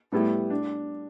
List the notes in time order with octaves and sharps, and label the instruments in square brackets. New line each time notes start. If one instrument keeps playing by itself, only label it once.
[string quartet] A2 [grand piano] G3 B3 E4 G4
[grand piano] D4